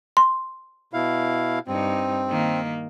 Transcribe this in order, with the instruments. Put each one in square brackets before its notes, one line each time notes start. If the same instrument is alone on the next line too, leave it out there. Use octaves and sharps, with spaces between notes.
[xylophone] C6
[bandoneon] B2 E4 F5
[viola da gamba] G2 D#4 [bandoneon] C4
[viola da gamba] D#3 A#3